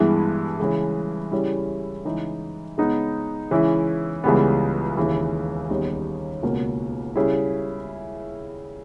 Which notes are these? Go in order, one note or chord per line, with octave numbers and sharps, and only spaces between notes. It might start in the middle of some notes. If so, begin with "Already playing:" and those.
Already playing: G2 E3 G#3 B3 E4
C#3 E3 G#3
C#3 G3 C#4 E4
C#3 E3 G#3 D#4
C#3 G#3 B3 D#4
C#3 E3 G#3 C#4 E4
C#2 C#3 E3 G3 B3
D#2 C#3 E3
D#2 C#3 G3 B3 D#4
C#2 B2 A#3 C#4
C#3 G3 C#4 E4